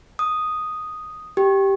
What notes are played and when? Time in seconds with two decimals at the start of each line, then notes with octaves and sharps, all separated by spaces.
0.19 D#6
1.37 G4